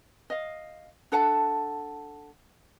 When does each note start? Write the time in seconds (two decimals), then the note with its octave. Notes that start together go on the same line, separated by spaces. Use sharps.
0.30 D#5 F5
1.12 D4 A4 F#5 A5